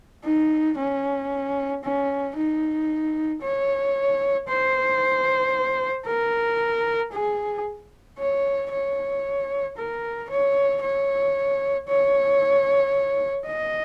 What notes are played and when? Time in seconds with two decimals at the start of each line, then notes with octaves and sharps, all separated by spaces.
0.24 D#4
0.78 C#4
1.83 C#4
2.37 D#4
3.41 C#5
4.48 C5
6.06 A#4
7.12 G#4
8.18 C#5
8.71 C#5
9.77 A#4
10.30 C#5
10.81 C#5
11.88 C#5
13.47 D#5